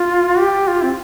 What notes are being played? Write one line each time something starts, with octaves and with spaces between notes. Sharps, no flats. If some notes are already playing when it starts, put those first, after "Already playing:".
Already playing: F4
G4
F4
C4